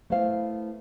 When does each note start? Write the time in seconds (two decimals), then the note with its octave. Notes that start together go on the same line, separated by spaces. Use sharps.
0.10 A3 B3 E4 C5 F5